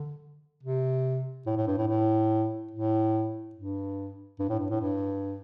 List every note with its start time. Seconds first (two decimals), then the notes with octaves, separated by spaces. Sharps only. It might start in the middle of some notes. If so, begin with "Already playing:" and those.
Already playing: D3
0.63 C3
1.46 A2
1.57 A2
1.67 G2
1.78 A2
1.88 A2
2.71 A2
3.55 G2
4.39 G2
4.49 A2
4.59 G2
4.70 A2
4.81 G2